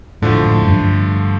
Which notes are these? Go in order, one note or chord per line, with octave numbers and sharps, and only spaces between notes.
A2 D3 F3 A3
A2
F#2
G2